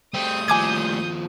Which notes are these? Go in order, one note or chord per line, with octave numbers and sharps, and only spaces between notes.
G3 A3 C4 D#6 G6
D#2 F3 G#5 D6 G#6